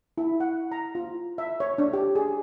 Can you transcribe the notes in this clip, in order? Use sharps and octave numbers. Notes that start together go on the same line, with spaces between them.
E4
F#5
A#5
F4
E5
C#5
D4
G4
G#4